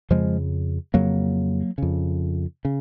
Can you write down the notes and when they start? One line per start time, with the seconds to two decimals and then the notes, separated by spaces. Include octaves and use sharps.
0.10 F2 C#3 F3 G#3
0.94 F2 C#3 F#3 A#3
1.78 F2 C#3
2.65 C#3